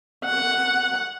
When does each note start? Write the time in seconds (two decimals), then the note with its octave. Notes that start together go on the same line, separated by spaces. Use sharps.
0.25 F#5